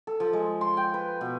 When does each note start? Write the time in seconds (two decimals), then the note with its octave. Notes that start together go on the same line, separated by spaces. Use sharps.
0.07 A4
0.20 F3
0.33 G#3
0.61 C6
0.77 G5
0.94 B4
1.21 B2